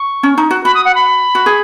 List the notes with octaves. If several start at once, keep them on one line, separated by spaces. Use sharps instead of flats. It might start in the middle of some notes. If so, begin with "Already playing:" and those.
Already playing: C#6
C#4
D#4
F#4
F#4 B5
D#6
F#5
B5
F#4
G#4